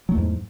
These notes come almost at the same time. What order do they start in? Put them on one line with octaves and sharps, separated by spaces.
F#3 A3 E2 G#2